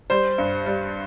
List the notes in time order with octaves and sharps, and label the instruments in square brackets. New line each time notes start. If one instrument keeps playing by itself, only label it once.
[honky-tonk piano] G3 [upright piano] C5
[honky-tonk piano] G2
G3